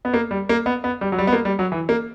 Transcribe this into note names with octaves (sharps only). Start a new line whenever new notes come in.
B3
A#3
G3
A#3
B3
B3
G3
F#3
G3
B3
A#3
G3
F#3
E3
A#3